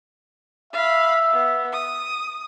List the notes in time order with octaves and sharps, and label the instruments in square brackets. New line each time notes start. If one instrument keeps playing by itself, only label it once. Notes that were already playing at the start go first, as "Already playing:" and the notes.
[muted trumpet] E5 [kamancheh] F5 B5
[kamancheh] B3
D#6